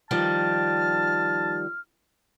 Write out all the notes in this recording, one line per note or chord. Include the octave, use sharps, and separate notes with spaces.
D#3 F3 G3 A5 F6